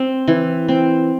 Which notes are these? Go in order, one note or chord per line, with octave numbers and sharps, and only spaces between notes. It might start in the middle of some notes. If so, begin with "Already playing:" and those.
Already playing: C4
E3
C4